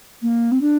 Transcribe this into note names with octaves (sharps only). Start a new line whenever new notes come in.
A#3
C4
D4